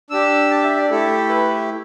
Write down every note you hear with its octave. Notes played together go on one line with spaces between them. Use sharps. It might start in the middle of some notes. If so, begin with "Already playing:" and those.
D4 G4 E6
A5
E5
D5
A3 E4 G4 A4
B4